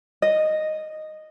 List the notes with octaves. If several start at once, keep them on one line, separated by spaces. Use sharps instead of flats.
D#5